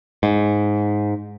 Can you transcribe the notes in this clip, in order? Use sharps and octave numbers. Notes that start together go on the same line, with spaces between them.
G#2